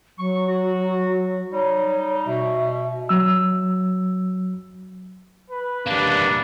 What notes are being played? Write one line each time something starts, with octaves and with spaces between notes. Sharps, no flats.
F#3 C#6
F#4
G3 D#4 C#5
B2 E5
F#3 E6
B4
G3 A#3 D4